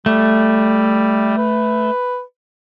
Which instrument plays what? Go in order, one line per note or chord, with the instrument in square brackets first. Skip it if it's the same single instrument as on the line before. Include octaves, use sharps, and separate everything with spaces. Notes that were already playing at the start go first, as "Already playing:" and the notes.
[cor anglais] G3 [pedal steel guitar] A3
[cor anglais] B4